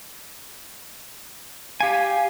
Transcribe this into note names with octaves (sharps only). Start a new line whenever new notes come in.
G4 F5 G#5